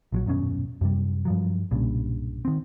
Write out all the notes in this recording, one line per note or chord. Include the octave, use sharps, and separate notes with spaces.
A#1 F3 F#3
D#1 F#2 B2 C#4
F#2 C3 G3
G2 F3 F#3
B1 G2 A#2 C#3
D#3 C4